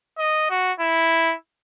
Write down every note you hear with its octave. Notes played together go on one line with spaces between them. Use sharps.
D#5
F#4
E4